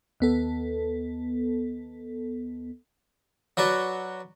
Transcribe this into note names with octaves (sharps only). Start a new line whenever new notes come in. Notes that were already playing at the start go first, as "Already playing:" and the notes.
D#2 B3 A4
F#3 F#4 B4 D5